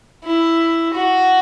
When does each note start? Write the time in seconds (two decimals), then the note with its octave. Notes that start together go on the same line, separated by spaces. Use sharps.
0.25 E4
0.94 F#4